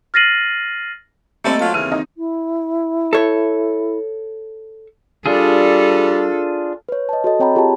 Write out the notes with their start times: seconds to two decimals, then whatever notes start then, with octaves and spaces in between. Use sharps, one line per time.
0.14 F6 A6 A#6 C7 D#7 F#7
1.44 G3 A3 A#3 C4 A4 D#5
1.59 F#3 F4 A5
1.74 D#2 C#3 E3 C4 F6
1.92 D#4
2.15 E4
3.13 A4 C#5
5.26 G3 D4 F4 G#4 A4
6.89 B4 C#5
7.09 D#5 A5
7.24 F#4 A4 D#5
7.40 C4 C#5 G5 A#5 B5
7.56 F4 G4 G#4 G5 A5